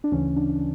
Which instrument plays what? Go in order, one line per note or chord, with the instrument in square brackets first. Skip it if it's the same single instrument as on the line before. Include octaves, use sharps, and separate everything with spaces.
[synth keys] D4
D2 C#3 E3 C#4
D4